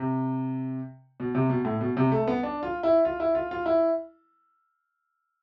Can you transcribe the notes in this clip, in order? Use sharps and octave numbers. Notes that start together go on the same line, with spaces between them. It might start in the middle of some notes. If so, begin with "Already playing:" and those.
Already playing: C3
B2
C3
B2
A2
B2
C3
A3
B3
D4
F4
E4
F4
E4
F4
F4
E4